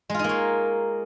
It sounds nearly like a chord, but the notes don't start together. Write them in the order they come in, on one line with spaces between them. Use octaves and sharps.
G#3 F4 D#4 A#3 C#5